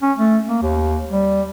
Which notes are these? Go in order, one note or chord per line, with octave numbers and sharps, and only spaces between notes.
C#4
A3
A#3
D#2
G3